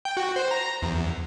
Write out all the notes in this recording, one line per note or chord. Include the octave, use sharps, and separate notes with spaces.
G5
F#4
C5
A#5
E2